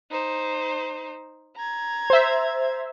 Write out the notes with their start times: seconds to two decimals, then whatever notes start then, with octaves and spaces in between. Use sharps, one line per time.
0.11 D#4 C5
1.56 A#5 G#6
2.10 C5 E5